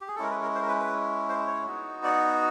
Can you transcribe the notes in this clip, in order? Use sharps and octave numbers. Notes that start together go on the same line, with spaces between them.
G4
G#4
A4
G#3 C#4 E4 A#4
B4
A#4
C5
A#4
B4
B4
C5
C#5
B3 D#4 F#4
D5